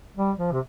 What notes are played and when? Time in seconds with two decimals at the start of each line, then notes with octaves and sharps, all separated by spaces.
0.16 G3
0.38 F3
0.52 C3